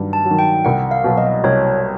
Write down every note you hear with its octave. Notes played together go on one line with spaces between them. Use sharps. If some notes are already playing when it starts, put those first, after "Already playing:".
Already playing: G2 D#3 F#3
A5
F#3
D#3
G5
C2 F#5
F5
B2 F#3
D#5
C2 C#5